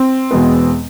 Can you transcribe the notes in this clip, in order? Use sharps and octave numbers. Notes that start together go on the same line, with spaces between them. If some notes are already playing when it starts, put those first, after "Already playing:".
Already playing: C4
E2 B2 G#3 B3